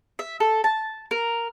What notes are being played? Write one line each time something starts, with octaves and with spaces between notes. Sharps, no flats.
E5
A4
A5
A#4